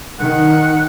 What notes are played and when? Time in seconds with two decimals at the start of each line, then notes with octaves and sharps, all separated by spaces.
0.20 D#3 F#5